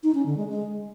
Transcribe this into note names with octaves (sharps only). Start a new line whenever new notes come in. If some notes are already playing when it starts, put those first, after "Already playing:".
D#4
C#4
D3
G#3
G#3